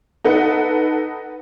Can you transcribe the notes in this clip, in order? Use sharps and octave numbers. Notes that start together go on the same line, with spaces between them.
D#4 A4 B4 F#5